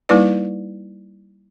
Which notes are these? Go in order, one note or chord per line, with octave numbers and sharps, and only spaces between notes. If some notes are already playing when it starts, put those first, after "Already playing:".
G3 A#3 D#4 E4 B4 D5